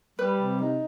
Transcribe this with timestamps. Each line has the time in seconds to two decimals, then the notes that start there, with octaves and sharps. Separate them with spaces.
0.19 G3 B4
0.40 C3
0.60 D#4